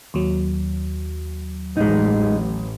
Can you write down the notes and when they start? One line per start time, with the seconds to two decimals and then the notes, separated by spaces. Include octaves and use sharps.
0.14 D#2 F#3
1.77 A1 G#3 D#4